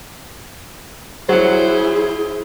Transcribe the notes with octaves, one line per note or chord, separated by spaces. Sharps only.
F#3 E4 G#4 C5 F#5